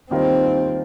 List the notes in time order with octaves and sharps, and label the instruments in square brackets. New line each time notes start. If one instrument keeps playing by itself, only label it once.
[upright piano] D#2 D#3 G3 A#3 F4 [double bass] C4